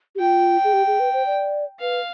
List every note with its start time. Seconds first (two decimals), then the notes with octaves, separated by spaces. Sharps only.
0.15 G4
0.19 F4 G5
0.64 G#4
0.73 G4
0.87 G#4
1.00 B4
1.13 C5
1.26 D5
1.80 B4 F5